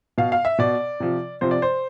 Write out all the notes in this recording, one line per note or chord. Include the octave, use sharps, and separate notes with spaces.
B2 F5
F5
E5
B2 D5
C3 F3
C3 F3 C5
D5
C5